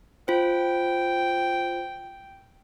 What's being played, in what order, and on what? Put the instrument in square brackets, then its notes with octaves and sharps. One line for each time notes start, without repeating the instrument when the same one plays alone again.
[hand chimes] F4 C5 [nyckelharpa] G5